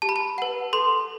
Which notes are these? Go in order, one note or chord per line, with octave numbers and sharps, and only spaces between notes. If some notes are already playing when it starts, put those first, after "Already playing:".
G4 A5
B5
A5
B4 F#5
A4 C6